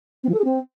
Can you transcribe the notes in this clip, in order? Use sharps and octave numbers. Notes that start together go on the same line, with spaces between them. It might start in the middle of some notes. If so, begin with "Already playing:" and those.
C4
F3
A4
G#4
C4